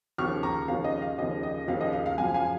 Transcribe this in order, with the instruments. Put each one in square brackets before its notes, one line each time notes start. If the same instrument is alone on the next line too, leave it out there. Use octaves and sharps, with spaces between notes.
[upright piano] D#2 C#3 F3 C#6 F6
A#5 C#6
D#2 C#3 F3 F5
D#5
F5
D#2 C#3 F3 D#5
D#5
D#2 C#3 F3 F5
D#5
F5
F5
F#2 C#3 F3 F5 G#5
F5 G#5